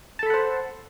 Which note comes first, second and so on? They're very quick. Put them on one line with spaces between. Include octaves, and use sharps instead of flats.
A5 A4 B5 F#5 C5